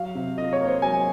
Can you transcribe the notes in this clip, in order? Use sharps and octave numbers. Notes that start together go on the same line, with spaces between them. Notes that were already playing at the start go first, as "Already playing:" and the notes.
Already playing: F#3 F5
C3
F4 D#5
C#5
A#3
C5
F#3 G#5